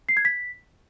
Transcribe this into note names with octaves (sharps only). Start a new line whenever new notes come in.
C7
G#6
B6